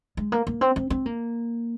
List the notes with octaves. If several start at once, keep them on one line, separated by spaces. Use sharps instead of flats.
G#3
A#3
A#3
C4
C4
C4
A#3